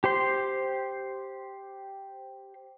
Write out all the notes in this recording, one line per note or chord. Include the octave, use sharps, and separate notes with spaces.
G4 C5 C6